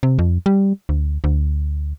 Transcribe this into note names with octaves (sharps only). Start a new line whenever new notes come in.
C3
F2
G3
D2
D2